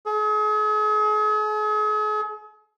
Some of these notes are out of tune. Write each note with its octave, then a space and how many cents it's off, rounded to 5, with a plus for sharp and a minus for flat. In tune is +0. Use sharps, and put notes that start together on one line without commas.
G#4 +40